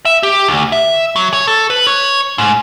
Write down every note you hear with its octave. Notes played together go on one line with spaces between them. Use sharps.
E5
G4
D2
E5
F#3
C#5
A4
B4
C#5
G#2